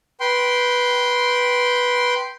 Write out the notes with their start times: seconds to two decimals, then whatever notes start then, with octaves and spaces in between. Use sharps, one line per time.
0.20 B4 G5 C6